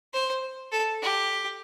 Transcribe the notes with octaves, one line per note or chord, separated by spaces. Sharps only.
C5
A4
G4